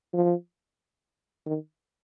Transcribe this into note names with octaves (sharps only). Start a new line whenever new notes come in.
F3
D#3